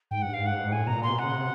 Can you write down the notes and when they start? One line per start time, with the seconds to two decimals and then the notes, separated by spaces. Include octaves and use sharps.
0.11 G#2 G5
0.22 G2 F#5
0.33 G#2 F5
0.46 F#5
0.57 G2
0.64 G#2
0.72 A2 G#5
0.87 B2 A#5
0.93 A#2
1.03 C6
1.08 C3
1.13 B2
1.19 C#3 F#5
1.34 C3